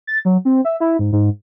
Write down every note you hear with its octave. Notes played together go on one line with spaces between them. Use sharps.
A6
F#3
C4
E5
E4
G#2
G#2